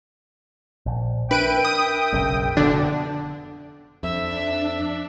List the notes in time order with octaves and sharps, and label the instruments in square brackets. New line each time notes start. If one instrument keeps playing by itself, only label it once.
[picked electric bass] A#1
[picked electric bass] D4 [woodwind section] A#4 E5 G5 [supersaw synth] B4 D7 D#7
[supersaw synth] D#6
[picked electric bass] F#1 B1 C#3
[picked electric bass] F1 B2 [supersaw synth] D3 D4
[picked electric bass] F2 [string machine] D4 [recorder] E5